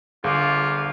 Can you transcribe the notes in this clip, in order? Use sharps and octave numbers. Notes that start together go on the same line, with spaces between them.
G1 F4 G#4 F5 D6